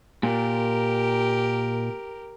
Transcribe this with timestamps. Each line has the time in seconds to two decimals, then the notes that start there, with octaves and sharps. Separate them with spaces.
0.23 A#2 G4 A#4